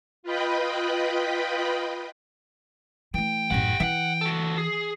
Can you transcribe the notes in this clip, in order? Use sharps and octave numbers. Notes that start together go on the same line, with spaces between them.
F4 B4 D#5 G5 B5
E3 A3 G5
A1 F#2 G4 F#5
E3 E5 F#5
F#4 A4
G#4